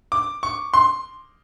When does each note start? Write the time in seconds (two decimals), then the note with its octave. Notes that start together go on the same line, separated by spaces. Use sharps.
0.12 D6
0.43 C#6
0.74 C6